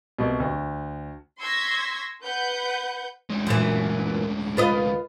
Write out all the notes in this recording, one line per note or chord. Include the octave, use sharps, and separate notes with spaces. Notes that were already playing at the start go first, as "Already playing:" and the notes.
C2 B2
D2
C6 C#6 E6 G#6 A#6 B6
B4 F#5 G6
D2 G#3
F#2 A#2 E3
F4 B4 D#5